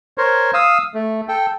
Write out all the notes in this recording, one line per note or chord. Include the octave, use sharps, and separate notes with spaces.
A#4 C5 C#5
F5 D#6 E6
A3
A4 G5